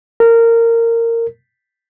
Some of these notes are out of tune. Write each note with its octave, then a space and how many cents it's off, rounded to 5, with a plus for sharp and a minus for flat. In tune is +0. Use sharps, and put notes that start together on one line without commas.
A#4 -15